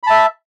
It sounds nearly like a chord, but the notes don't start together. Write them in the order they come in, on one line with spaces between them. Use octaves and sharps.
B5 A5 E5